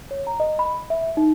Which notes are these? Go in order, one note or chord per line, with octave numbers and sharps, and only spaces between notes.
C#5
A#5
D#5
B5
E5
D#4